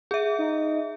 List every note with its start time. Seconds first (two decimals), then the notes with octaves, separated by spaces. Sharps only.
0.11 G#4 E5
0.39 D#4